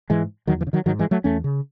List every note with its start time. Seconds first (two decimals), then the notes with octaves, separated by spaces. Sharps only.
0.10 G#2 E3 G#3
0.47 E2 D#3 F#3
0.61 E3
0.67 C#3
0.73 D#3 F#3
0.86 G#2 D#3 F#3
0.99 E3 G#3
1.11 F#3 A3
1.24 E2 A3 C#4
1.44 C#3